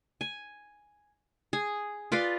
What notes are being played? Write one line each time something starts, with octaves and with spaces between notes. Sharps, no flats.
G#5
G#4
F4 B4 D5 F5